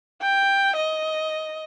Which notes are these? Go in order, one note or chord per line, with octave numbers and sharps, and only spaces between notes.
G5
D#5